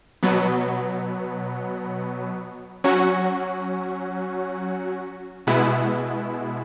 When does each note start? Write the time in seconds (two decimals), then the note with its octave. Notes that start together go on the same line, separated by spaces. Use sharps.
0.23 B2 F#3 B3
2.84 F#3 C#4 F#4
5.47 B2 G#3 B3 E4